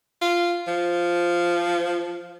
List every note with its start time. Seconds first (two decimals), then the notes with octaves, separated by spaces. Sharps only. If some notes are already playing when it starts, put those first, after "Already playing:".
0.21 F4
0.67 F3